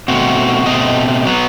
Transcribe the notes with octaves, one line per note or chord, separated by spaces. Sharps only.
B2 A3 C4 F#4
B2 A3 C4 D#5
F#3 B3